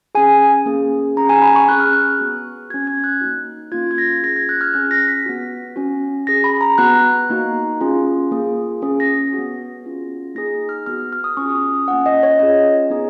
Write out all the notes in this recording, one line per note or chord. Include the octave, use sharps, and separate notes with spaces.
C#4 G#4 G#5
A#3 C#4 G#4
C#4 G#4 A#5
G#5
B5
C#6
C#4 G#4 F#6
F6
F#6
B3 F#4
C#4 F#4 G#6
G#6
F#6
A#3 D#4 F#4
A#3 C#4 F4 G#6
G#6
A#6
C#4 F4 G#4 A#6
G#6
F#6
F6
C#4 F4 G#4 F#6
A#6
B6
B3 F#4
C#4 F#4
C#4 G#4 A#6
B5
A#5
B3 F#4 F#6
A#3 D#4 F#4
C#4 F4 G#4
A#3 F4 G#4
C#4 G#4
A#6
B3 F#4
C#4 F4 G#4
A#3 D#4 G#4 A#6
F6
B3 F#4 F6
F6
D#6
C#4 F4 G#4 C#6
D#6
A#3 C#4 F4 F#5
D#5
C#5
C#4 F4 G#4 D#5
B3 D#4 G#4